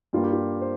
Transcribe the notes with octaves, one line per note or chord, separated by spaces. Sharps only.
G2 G3 A#3 F4
G4
F4
C5